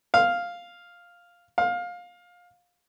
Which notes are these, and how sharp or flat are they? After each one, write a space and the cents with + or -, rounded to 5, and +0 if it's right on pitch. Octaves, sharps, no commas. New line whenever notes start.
F5 +0
F5 +20